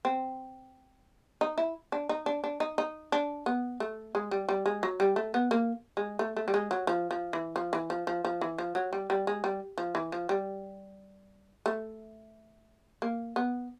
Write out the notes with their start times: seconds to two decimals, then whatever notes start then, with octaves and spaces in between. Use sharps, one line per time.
0.05 C4
1.41 D#4
1.58 E4
1.92 D4
2.09 D#4
2.26 D4
2.44 D4
2.60 D#4
2.78 D#4
3.12 D4
3.46 B3
3.80 A3
4.15 G#3
4.31 G3
4.49 G3
4.66 G#3
4.83 F#3
5.00 G3
5.16 A3
5.34 B3
5.51 A#3
5.97 G#3
6.19 A3
6.36 A3
6.48 G3
6.54 G#3
6.71 F#3
6.87 F3
7.11 F3
7.33 E3
7.56 F3
7.73 E3
7.90 F3
8.07 F3
8.25 F3
8.41 E3
8.58 F3
8.75 F#3
8.93 G3
9.10 G3
9.27 G#3
9.44 G3
9.78 F3
9.95 E3
10.12 F3
10.29 G3
11.66 A3
13.02 A#3
13.36 B3